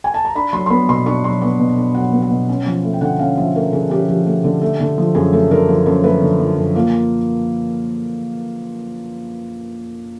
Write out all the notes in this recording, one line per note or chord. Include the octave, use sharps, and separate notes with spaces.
G#5
A5
A#5
D4 B5
F#3 C6
C6
B3 B5
B2 C6
D4 C#6
F#3 C6
B3 C#6
B2
D4
F#3 F#5
B3
F#5
B2
C#4
F3
A3
G5
D3 F#5
C#4 F5
F3 E5
A3 A#4
D3 G#4
C#4 G4
F3 G4
A3
D3
A3
D3
F3
F#2 G#4
A3 A4
D3 A#4
F3
F#2 C5
A3 B4
D3
F3
F#2
A#3 F4